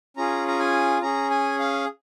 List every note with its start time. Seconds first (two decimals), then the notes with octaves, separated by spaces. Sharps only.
0.17 C#4 F4 G#4 A#5
0.48 A#5
0.59 G#5
1.02 C#4 G#4 A#5
1.30 G#5
1.59 F5